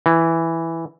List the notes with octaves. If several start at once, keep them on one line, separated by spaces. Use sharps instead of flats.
E3